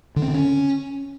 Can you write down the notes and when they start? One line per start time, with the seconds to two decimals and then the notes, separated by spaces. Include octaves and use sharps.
0.16 D3
0.22 C4
0.28 D3
0.34 C#4